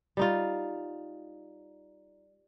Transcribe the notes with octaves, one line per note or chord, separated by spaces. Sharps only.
G3 D#4 F4